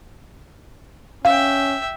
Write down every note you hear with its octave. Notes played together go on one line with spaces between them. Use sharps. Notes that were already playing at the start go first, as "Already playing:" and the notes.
C#4 E5 F5 G5